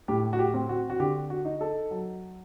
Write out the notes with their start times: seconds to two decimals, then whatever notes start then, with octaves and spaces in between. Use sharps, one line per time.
0.08 A2 G4
0.33 F#4
0.39 G4
0.54 C4
0.69 F#4
0.90 F#4
1.00 D3 G4
1.30 F#4
1.45 D#4
1.61 A4
1.91 F#3